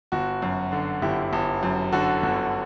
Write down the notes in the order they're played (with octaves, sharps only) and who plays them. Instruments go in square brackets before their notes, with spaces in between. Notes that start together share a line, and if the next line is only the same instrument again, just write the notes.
[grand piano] G1 F#4
F#2
D3
G1 E4 G4
G1
F#2
D3 F#4 A4
G1